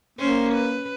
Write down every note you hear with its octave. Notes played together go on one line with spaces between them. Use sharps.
A#3 C#4 C5
B4